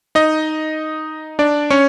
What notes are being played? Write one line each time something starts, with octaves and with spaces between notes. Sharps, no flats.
D#4 D#5
D4 D5
C#4 C#5